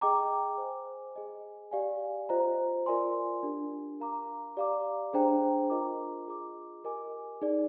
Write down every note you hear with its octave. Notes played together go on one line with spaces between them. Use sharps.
G#4 D#5 G5 A#5 D6
C5 D#5 G#5
G#4 D#5 G#5
G4 D5 F5 G#5
F4 C5 D#5 A#5
F4 A#4 D5 G#5 C6
D4 G4 A#4
A#4 F5 A#5 D6
G4 D5 F5 A#5 D6
D4 G#4 C5 G5 A#5
F4 A#4 D#5 A#5 D6
F4 G#4 D#5 A#5 D6
G4 A#4 D#5 G#5 D6
D#4 G#4 D5